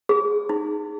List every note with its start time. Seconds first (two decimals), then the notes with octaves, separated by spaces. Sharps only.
0.09 G#4
0.49 D#4